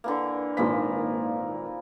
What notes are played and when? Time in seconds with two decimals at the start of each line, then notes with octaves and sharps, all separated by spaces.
0.04 D3 E3 A#3
0.57 G#1 A#2 E3 F3 A#3 B6